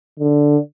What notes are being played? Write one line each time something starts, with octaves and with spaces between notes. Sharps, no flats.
D3